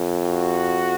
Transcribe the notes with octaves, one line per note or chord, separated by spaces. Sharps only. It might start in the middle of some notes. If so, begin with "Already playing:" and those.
Already playing: F2
F#4